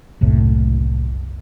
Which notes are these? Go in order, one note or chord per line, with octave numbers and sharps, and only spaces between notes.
F#1 C2 A2